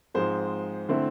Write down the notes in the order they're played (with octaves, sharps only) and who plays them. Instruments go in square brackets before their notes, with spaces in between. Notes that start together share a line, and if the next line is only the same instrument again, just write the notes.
[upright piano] G#2 F3 G#3 C4 C5
D3 A3 C4 E4